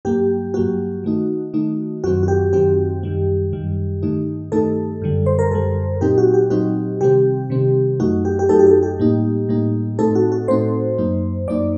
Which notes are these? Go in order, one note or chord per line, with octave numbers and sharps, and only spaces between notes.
G2 F#3 A#3 G4
G2 F#3 A#3 F#4
D#3 A3 D#4
D#3 A3 D#4
F#2 D#3 F#3 C4 F#4
F#4
G4
F#2 D#3 F#3 C4 G4
F#2 D#3 G3
F#2 D#3 G3
G2 D#3 A3 D#4
G2 D#3 A3 D#4 A4
F#2 D3 G3
C5
A#4
F#2 D3 G3 A4
A#2 F#3 C4 D#4 G4
F#4
G4
A#2 F#3 C4 D#4 F#4
C3 D#3 G3 C4 G4
C3 D#3 G3 C4
F#2 F#3 A3 D#4 F#4
G4
G4
F#2 F#3 A3 D#4 A4
G4
A4
G4
A2 G3 A#3 D#4
A2 G3 A#3 D#4
A2 A3 C4 D#4 A4
F#4
F#4
A2 A3 C4 D#4 C5
F#2 F#3 A#3 D#4
F#2 F#3 A#3 D#4 D5